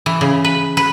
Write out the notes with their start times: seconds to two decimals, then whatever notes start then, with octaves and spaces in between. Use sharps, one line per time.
0.06 E3
0.21 C#3
0.45 B4
0.77 B4